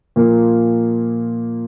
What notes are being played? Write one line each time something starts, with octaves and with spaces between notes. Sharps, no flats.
A#2 F3 A#3